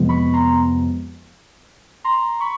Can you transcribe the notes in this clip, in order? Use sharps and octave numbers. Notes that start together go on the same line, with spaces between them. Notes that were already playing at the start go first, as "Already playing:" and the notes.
Already playing: F2 C3 F3 G#3 B3
B5 C#6
A#5 C6
A#5 C6
B5 C#6